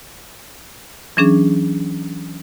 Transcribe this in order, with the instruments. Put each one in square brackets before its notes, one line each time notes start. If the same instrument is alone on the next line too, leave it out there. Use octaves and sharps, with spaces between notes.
[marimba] E3 F#3 C#4 D4 G#4